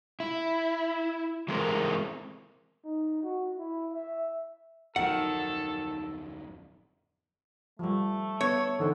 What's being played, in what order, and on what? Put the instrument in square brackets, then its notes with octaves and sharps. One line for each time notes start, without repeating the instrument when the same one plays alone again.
[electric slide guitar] E4
E3 G#3 A3 C4 A#4
[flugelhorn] D#4
F#4
E4
E5
[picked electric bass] D1 F2 F#3 [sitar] D#3 [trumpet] A4 [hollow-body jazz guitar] F#5
[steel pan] F3 G3 [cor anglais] A3
[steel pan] B3 [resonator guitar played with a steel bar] C#5
[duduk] D3 [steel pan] E3 D#4 C5